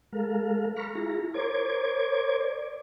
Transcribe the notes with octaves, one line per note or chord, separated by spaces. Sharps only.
G#3 A4 A#4 F5
A#5 B5 C#6 F6
E4 F4 G#4 A#5
A#4 C5 C#5 D6 G#6
D5